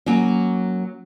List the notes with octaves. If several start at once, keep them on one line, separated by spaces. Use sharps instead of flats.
F#3 A#3 C#4